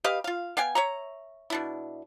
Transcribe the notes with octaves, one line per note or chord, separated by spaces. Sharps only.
G4 B4 D#5 F5
F4 F5
B3 F5 G5 G#5
C#5 E5 A#5
B2 D4 E4